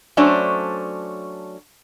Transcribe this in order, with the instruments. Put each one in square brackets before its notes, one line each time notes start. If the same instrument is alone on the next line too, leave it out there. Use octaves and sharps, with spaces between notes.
[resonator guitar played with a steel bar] F#3 A3 C#4 D4 C5